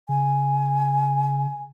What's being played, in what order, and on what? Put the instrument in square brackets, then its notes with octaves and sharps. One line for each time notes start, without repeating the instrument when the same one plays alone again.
[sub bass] C#3 [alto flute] G#5